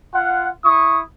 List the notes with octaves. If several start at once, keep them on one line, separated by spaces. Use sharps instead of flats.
F4 F#5
E4 C#6 D#6